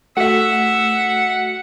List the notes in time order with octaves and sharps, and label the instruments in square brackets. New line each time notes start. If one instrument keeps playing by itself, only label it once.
[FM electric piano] A3 F#4 [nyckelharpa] E5 [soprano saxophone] F#5